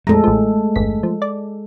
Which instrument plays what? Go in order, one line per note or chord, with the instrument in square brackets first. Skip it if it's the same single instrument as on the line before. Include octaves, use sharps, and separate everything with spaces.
[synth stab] A#1 F2 A#5 [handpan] G#3 A4 [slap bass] A3
[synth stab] A1 F3
G1 E2 B6
F3
D5